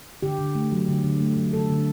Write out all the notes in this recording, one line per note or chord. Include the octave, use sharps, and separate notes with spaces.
D3 G4
D3
A3
F#3
D3
D3
A3
F#3
D3 A4
D3